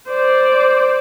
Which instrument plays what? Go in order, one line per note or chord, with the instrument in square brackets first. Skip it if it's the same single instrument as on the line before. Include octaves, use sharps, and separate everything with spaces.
[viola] C5 D5